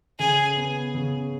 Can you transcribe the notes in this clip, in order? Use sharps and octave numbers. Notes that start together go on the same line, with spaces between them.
C#3 G#4
B3
C#3